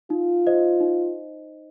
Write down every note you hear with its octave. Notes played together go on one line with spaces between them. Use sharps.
D#4 F4
C5 D#5
D#4